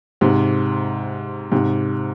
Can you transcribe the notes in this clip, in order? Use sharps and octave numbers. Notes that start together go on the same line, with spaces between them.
G#2 C3
G#2 C3